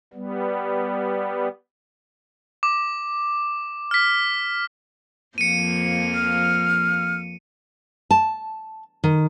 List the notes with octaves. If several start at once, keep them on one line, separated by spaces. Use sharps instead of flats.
G3 B3
D6
F6 B6
F2 F3 A#3 C#7 D#7
F6
A5
D#3